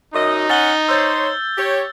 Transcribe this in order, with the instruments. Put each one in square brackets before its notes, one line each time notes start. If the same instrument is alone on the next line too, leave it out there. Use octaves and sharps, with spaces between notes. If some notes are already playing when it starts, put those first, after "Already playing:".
[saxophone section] F#2 D#5 [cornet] D#4
[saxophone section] C#4 F#5 [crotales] A6 G7
[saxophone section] C5 C#5 [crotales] E6 G6 A6
[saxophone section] G4 C#5